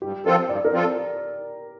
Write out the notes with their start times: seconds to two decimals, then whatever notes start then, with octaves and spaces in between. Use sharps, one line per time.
0.02 G2 G4
0.26 F3 C4 F4 A4 A#4
0.49 G2 D5
0.65 A#4
0.72 F3 C4 F4 A4